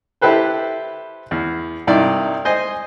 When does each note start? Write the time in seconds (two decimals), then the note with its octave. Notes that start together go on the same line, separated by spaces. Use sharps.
0.21 E4 G4 A4 B4 C5
1.31 E2
1.87 C2 G2 D#4 E4 D5
2.45 C5 D#5 G#5